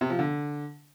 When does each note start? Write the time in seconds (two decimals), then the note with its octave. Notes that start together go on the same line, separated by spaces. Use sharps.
0.01 C3
0.10 F3
0.19 D3